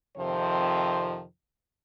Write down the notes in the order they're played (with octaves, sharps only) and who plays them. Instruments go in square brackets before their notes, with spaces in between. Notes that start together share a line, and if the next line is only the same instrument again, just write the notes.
[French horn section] F2 C3 D#3 F3 C5